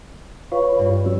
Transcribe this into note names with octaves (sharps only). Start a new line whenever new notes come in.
F4 B4 C#5
G2
F#3 C#4 E6